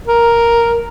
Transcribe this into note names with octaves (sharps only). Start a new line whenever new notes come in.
A#4